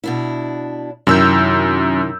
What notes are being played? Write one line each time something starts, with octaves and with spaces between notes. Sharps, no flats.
B2 D4 E4
F#2 C3 D#3 E4 E6 G6